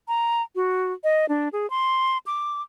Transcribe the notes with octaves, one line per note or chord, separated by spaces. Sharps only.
A#5
F#4
D#5
D4
G#4
C6
D6